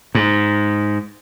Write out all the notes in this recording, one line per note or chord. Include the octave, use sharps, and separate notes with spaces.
G#2